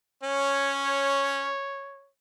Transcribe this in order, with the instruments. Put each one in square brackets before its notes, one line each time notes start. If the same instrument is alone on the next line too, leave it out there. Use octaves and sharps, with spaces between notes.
[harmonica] C#4 [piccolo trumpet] C#5